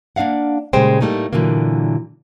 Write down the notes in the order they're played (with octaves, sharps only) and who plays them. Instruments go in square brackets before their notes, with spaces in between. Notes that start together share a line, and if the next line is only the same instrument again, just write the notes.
[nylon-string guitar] A#3 D4 D5 F5 F#5
A#2 C#3 G3 G#3 C5 G5
A2 G3 A3 A#3 D#4
A#2 D3 E3 F#3 A#3